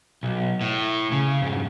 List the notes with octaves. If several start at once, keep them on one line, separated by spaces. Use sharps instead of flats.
B1
A2
C#3
F2 G#2